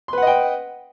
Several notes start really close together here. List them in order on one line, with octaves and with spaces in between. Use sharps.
C6 B4 F#5 D#5 G5